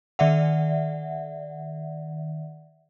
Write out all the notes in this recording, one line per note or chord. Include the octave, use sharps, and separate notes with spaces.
D#3 D5 E5 F#5